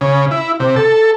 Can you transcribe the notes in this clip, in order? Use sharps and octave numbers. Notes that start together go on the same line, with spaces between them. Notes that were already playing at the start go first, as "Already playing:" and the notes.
C#3
E4
C3
A4